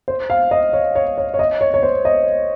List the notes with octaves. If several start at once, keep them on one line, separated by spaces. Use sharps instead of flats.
C5
F5
D#5
C#5
C#5
C#5
C#5
D#5
C#5
C#5
C5
D#5